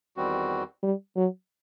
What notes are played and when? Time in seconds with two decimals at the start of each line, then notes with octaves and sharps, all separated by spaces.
0.17 E2 D#3 G3 C4 F#4
0.83 G3
1.16 F#3